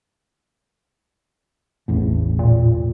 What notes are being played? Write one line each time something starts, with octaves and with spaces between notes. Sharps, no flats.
A1 E2 A2
A#2